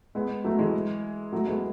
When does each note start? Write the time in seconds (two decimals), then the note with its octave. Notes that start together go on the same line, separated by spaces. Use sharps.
0.15 G#3 B3
0.44 F#3 A3
0.59 E3 G#3
1.32 F#3 A3
1.47 G#3 B3